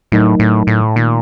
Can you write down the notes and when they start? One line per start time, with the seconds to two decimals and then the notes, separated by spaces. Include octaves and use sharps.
0.12 A2 F#3 A3 D#4 A#4 D#5
0.39 A2
0.67 A2
0.96 A#2 D#3 A3 D#4